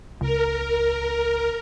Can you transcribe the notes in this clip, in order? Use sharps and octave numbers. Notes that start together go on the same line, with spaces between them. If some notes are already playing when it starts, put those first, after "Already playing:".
C#2 A#4